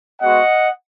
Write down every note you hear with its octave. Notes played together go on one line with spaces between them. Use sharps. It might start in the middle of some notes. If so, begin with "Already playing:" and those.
G#3 B3 F#4 D#5 F#5